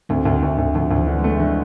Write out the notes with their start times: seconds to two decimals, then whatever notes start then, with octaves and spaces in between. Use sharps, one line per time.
0.09 D2 A3 C4
0.25 D2
0.43 D2
0.58 D2
0.74 D2 F3
0.91 D2
0.96 E3
1.07 D3
1.19 G#3
1.24 A3
1.40 D3 E3